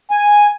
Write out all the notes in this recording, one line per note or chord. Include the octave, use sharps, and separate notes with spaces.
G#5